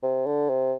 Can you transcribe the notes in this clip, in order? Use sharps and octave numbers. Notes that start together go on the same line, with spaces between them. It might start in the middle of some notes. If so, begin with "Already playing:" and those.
C3
D3
C3